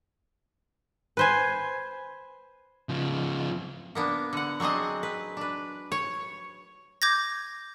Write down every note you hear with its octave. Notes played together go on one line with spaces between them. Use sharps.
B4 C5 G#5
C#3 F3
A#3 B3 D4
D3 F#5
F#3 C4 D4 G#4 D#5
B4
D4 B4
C#5
D6 G6 G#6 A#6